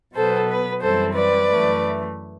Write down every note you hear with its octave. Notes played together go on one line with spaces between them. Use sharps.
B2 F#3 B3 A4 C5
B4
F#2 E3 G3 C4 A4 C5
B4 D5
F#2 E3 A3